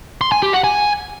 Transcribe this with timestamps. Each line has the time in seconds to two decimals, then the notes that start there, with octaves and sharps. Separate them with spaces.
0.21 C6
0.32 G#5
0.43 G4
0.53 F#5
0.64 G#5